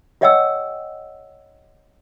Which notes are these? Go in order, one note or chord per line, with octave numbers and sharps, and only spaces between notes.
G4 C#5 D#5 F#5 G5 E6